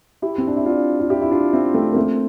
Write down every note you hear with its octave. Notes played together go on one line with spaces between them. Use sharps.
E4 G4
C4
D4
E4
D4 F4
F4
E4 G4
E4
D4 F4
C4 E4
A3 C4
A#3
A3 C4